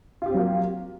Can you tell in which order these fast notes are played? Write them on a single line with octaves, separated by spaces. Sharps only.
F4 G4 C4 F#3 A#3